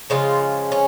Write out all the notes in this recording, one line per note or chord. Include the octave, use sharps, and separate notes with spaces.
C#3 F3 G#3 F4
C#4